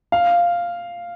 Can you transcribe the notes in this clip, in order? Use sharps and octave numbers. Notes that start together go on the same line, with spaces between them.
F5